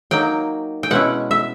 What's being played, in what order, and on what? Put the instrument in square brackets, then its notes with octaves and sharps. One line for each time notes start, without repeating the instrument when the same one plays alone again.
[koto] F#3 A#3 D#4 G5
G5
B2 G#3 C#4 E4 F#5
E5